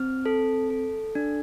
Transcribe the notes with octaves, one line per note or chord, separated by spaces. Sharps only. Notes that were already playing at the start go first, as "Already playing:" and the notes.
Already playing: C4 F6
A4
A4
D4